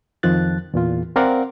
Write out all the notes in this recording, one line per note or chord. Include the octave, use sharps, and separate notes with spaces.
F2 D#3 F3 F#6 A6
E2 A#2 F4
C4 A#4 D5 F5 F#5